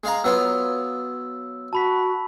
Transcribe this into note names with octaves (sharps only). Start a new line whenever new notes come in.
G#3 F5 A#5
F#3 B3 F4 E6
F#4 A5 B5 B6